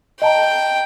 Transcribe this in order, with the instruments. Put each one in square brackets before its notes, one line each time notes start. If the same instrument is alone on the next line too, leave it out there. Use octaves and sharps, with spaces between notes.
[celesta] D#5 A5 A#5 [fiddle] G5